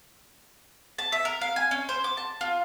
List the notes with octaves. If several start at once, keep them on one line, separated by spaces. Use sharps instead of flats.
A5
E5
A#4
F5
G#5
C#4
C5
D6
A5
F4